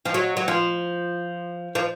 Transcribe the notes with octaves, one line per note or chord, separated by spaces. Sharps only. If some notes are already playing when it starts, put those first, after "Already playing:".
F3
F#3
F#3
F3
F3